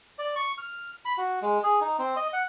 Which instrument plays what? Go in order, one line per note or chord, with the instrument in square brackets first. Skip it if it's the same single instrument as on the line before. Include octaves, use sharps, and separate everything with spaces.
[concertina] D5
C#6
F6
B5
F#4
G#3
G#4
D#4
C4
D#5
F#5